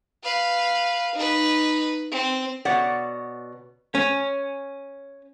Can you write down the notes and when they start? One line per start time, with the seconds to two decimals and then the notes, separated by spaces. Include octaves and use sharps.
0.23 B4 F5
1.15 D#4 B4
2.12 C4
2.65 B2 C#5 D5 F#5
3.95 C#4